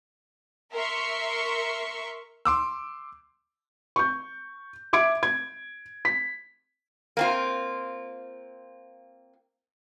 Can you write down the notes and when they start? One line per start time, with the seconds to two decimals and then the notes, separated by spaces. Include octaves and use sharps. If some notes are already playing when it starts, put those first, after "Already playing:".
0.73 A#4 E5 C6 C#6
2.45 C6 D6 E6
3.96 C#6 G6
4.93 E5 D6 G#6 D7
5.23 G#6
6.05 B6
7.17 A#3 C4 F4